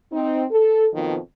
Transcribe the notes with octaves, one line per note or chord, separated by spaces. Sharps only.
C4 D#4
A4
F2 B2 D#3 F3